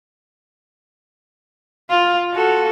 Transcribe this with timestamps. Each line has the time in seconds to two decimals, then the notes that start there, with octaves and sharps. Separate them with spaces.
1.90 F4
2.34 F#4 A4